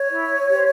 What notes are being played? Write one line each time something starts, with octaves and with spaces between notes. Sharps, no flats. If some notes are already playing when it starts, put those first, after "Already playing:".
Already playing: C#5
E4
G4 C5